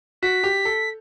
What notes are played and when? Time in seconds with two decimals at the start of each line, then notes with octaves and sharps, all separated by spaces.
0.23 F#4 B6
0.44 G4
0.65 A4